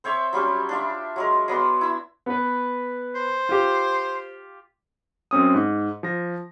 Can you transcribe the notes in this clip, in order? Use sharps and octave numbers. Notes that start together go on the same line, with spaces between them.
C4 C5 C#5 E5
F#3 G3 C#4 G4
D4 F4 E5
F#3 G#3 A#4
F#3 B3 D5 C6
E4 E6
B3 B4
C5
F4 G4
F#2 C4 C#4 D#6
G#2
F3 A#6